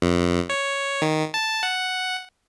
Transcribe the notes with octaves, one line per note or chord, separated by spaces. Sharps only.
F2
C#5
D#3
A5
F#5